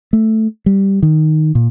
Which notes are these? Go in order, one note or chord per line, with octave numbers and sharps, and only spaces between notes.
A3
G3
D#3
A#2